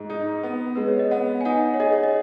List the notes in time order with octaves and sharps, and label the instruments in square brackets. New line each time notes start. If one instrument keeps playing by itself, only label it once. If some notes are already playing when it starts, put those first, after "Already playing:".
Already playing: [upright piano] G#2 [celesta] G#4
[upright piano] D#4
B3
[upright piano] G#3 [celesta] B4
[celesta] C#5
D#5
[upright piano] B3 [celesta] F#5
[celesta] G#5
[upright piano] D#4 [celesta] F#5
[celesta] C#5
[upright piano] G#4 [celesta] D#5
[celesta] C#5
D#5